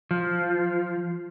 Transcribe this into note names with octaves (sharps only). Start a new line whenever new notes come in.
F3